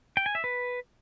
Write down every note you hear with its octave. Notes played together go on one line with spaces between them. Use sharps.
G5
G#5
E5
B4